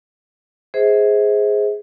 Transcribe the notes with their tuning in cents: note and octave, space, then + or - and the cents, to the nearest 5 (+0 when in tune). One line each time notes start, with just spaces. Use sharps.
G#4 +0 C5 +0 E5 -40